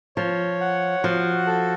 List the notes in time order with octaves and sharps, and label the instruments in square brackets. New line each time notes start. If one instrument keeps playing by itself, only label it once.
[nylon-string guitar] F3 [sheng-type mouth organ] C#5
[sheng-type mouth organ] F#5
[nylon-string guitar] F3 [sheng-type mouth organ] F#4
[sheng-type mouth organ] A4